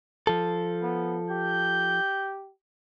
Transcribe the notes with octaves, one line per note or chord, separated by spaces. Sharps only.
F3 A4
B3
G4 G6